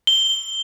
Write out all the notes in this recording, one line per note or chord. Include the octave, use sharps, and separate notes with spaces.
G7